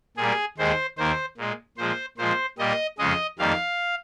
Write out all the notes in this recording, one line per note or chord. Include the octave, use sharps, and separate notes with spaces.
A#2 G3 A#3 G#4
D#2 D#3 G#3 C5
D#2 D#3 A#3 C5
A#2 G#3
A#2 F3 G#3 C5
A#2 F3 G#3 C5
A#2 G3 A#3 D#5
F2 C#3 G#3 D#5
F2 D#3 G3 A#3 F5